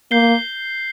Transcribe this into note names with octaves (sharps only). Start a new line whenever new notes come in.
A#3 G6 C7 G7